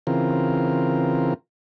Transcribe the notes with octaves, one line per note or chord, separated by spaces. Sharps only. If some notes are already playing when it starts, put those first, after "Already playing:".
C#3 E3 C4 F4 A#4